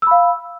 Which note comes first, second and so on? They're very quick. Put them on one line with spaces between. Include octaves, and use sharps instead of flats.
E6 B5 F5